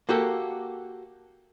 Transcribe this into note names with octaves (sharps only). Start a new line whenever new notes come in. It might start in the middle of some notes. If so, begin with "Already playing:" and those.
A#3 F#4 G4 A4